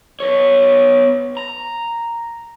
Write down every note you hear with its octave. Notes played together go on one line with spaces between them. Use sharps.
B3 C#5
A#5